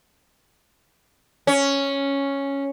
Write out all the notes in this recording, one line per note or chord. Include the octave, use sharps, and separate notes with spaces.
C#4